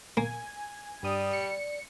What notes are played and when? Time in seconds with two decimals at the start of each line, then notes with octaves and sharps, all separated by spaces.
0.17 A#3 G#5
1.03 G2 G3 D5 D#6
1.33 C#7